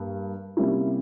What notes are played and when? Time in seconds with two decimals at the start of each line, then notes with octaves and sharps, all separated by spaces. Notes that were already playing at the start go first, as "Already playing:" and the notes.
Already playing: G2 A#3
0.57 C3 G3 A#3 C#4 E4